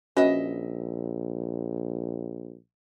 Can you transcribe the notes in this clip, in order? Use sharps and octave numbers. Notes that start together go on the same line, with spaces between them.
A#1 C#4 F#4 B4 D#5 E5